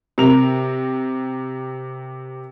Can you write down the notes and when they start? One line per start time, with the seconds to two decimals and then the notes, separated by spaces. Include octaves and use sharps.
0.18 C3 A#4 F7